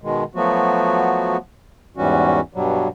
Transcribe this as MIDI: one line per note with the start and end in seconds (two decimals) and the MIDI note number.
0.02 0.24 47
0.02 0.24 51
0.02 0.24 56
0.35 1.37 53
0.35 1.37 54
0.35 1.37 57
0.35 1.37 59
0.35 1.37 66
1.97 2.40 40
1.97 2.40 44
1.97 2.40 52
1.97 2.40 55
1.97 2.40 61
1.97 2.40 66
2.54 2.88 43
2.54 2.88 47
2.54 2.88 54
2.54 2.88 55